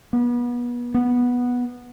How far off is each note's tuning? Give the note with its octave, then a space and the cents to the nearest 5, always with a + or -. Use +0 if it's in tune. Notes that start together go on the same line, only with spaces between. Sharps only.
B3 -30
B3 -10